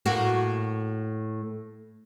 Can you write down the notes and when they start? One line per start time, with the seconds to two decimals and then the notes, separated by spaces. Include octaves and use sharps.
0.06 A2 A#3 F#4